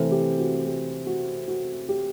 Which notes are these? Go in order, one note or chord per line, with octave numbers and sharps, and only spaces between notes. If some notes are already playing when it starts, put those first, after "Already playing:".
Already playing: C3 E3 A3 C4 C5
G4
F#4
G4
F#4
F#4
G4